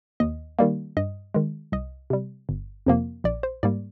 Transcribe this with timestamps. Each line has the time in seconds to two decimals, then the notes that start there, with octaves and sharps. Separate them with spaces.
0.20 D#2 D#5
0.59 D#3 G3 A#3
0.97 G2 D#5
1.34 D#3 G#3
1.72 C2 D#5
2.10 C3 G3
2.49 G1
2.86 F2 C3 F3 A#3
3.24 A#1 D5
3.43 C5
3.63 G#2 G3 A#3 D5